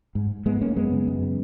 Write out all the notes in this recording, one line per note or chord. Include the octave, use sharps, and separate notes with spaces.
G#2
G#2 G#3 B3
A#3 C#4
F#2 G#3 B3
C#3
F#2
C#3